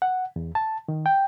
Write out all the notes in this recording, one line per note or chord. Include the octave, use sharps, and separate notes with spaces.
F#5
E2
A5
D#3
G5